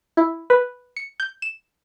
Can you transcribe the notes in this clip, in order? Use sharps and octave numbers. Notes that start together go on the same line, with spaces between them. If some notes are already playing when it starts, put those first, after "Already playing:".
E4
B4
C#7
G6
E7